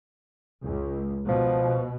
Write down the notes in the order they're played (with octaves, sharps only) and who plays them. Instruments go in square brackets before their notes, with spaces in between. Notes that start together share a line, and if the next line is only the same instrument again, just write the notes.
[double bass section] C#2
[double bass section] B2 [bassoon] F3